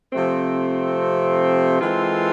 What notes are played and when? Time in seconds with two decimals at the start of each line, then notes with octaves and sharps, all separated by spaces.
0.13 C3 F3 A3 C4
1.80 E3 G#3 C4 F4 A4